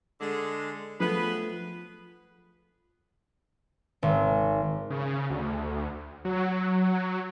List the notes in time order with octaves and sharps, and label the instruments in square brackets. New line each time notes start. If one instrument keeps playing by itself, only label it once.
[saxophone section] D3 G#3
[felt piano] F3 A3 [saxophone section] B3 G#4 B4
[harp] G#1
[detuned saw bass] C#3
D2
F#3